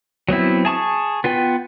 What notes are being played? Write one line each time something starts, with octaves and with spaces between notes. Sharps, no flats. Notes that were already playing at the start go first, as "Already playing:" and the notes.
F#3 B3 C4 E4
G#4 A5 C#6 D#6
B3 F4 B4 G5